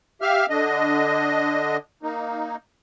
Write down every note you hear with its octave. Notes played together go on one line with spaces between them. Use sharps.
G4 E5 F5 F6
D3 D4 D#5
A#3 D#4